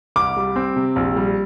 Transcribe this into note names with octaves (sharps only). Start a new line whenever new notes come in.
C2 D6
G3
C4
C3
A#1
G3